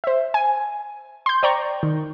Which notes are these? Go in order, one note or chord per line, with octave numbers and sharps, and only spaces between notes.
C5 E5
G#5
C6 G6
C5 D5 G5 A#5 C#6
D#3